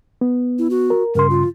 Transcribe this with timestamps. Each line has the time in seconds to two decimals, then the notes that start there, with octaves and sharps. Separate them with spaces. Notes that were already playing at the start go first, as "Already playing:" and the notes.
0.21 B3
0.59 E4
0.70 F#4
0.90 A#4
1.15 G2 C#3 A#4 C6
1.30 F4